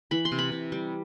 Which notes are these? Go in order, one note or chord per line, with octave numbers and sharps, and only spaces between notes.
E3 B5
C6
C3
B5
C3
G3